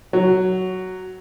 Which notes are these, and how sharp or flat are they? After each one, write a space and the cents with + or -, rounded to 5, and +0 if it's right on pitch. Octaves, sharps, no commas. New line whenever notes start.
F#3 +5